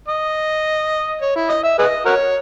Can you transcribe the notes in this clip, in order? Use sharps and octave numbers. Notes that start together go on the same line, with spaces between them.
D#5
C#5
E4
D#5
E5
G#4 B4 D#5
F#4 A#4 C#5